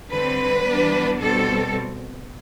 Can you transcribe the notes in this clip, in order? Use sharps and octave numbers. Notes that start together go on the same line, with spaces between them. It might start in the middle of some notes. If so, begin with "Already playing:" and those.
D3 G3 C4 B4
E3 G3 B3 D4
B2 G3 C4 A4